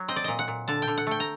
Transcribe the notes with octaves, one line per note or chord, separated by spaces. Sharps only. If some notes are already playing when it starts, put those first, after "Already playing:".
Already playing: F#3
C4 D#5
D5
A#2 D#5
F#5
A#2
D3 A5
G5
D3
F#5
A3 G5
A#5